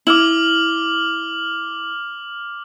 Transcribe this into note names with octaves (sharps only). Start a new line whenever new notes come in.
E4 D6 F6 F#7